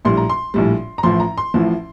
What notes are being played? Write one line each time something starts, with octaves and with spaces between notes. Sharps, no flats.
A#1 A2 G3 C6
A#5
C6
A#1 A2 G3
A#5
A1 A2 F3 C6
A#5
C6
A1 A2 F3